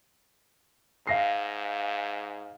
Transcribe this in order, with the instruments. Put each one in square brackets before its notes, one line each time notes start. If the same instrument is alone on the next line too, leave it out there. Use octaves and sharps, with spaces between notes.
[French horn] G#2 [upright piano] F5 A#6 C7